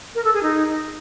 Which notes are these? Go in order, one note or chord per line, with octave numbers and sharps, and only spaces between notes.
A#4
A4
G#4
D#4